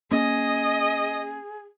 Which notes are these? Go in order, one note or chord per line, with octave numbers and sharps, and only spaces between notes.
A#3 C#4 G#4 D#5